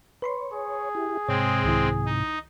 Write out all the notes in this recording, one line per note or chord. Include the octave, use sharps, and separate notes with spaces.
B4 C#5 B5 C6
G#4
E4 G4
G#2 C3 G#3 C4 C#5 G5
C2 D#3 E4
D#4